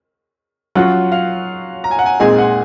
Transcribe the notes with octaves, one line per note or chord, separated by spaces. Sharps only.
F#3 C#4 F4 F#5
F5
A#5
G#5
F#5
G#5
A#2 G#3 C4 D#4 G#4 G#5
F#5